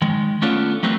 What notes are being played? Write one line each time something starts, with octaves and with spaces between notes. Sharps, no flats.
D#3 G#3
A3 B3 C#4 D4 F4 A4
F#3 G3 A3 A#3 C4 B4